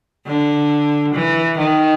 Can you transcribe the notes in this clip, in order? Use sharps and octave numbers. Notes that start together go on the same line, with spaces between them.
D3
E3
D#3